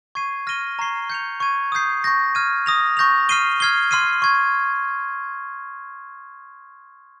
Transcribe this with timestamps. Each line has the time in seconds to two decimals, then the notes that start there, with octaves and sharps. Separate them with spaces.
0.15 C#6 G#6 C7 D#7
0.47 F6 A#6 D#7 G7
0.79 A#5 C#6 G#6 C7 G7
1.10 G6 C#7 F7
1.40 C#6 G#6 D#7
1.72 D#6 G6 C7
2.04 C#6 G6 A#6
2.35 F6 G#6 D#7
2.66 D#6 A#6 F7
2.97 C#6 G6 A#6 F7
3.29 F6 C7 D#7 G7
3.60 F6 G#6 C7 G7
3.91 C6 F6 C7 D#7
4.22 C#6 G#6